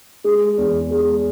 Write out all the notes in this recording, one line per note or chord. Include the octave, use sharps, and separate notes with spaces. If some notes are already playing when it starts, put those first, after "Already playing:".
G#3
E2
G#3